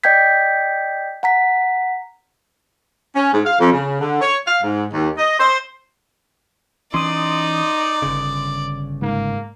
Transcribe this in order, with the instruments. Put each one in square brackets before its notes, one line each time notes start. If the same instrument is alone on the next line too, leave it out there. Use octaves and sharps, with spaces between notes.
[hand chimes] D5 D#5 G5 G6 G#6 B6
F#5 A#5 B6
[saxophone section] C#4
G#2
F5
F2
C#3
D3
C#5
F5
G#2
D#2
D#5
C5
[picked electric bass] E3 C#4 [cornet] D#4 [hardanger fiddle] D5 [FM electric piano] C6 D#6
[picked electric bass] G1 C#3
[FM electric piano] G#2 [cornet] A#3